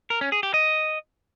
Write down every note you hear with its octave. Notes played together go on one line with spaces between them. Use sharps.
A#4
C#4
G#4
G4
D#5